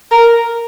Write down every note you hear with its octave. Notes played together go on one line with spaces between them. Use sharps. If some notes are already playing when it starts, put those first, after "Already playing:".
A#4